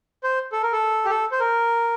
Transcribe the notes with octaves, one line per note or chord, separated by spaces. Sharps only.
C5
A4
A#4
A4
G4
A4
C5
A#4